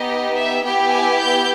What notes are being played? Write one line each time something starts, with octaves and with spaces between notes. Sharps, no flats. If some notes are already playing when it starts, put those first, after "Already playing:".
Already playing: B3 D#4 G4 D#5
E5
B3 E4 G4 G5
G#5
G6